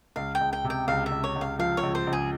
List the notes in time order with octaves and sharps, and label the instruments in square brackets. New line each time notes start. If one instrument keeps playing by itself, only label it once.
[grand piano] C#2 [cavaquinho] F5
[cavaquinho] G5
[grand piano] C#2
[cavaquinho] G5
[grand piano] C3
[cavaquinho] G5
[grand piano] C#2 [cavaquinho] F5
[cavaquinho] E5
[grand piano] C#2
[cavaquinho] C#5
[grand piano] C#2
[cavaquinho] F5
[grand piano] F3 [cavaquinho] F5
[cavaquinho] C#5
[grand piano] C#2
[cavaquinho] C5
[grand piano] C#2
[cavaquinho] G#4